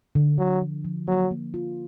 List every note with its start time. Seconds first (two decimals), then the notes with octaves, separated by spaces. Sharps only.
0.15 D3
0.38 D3 F#3
0.62 F3
0.85 F3
1.08 F#3 A#3
1.31 A#3
1.54 F4